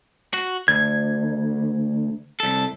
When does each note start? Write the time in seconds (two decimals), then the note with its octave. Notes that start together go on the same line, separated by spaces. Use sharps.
0.34 F#4
0.68 D2 G#6
2.40 C2 A4